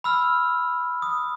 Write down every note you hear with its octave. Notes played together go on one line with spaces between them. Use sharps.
B5 E6 F6
D#6